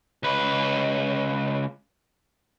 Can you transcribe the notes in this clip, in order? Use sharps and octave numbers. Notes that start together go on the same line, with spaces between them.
C#2 B4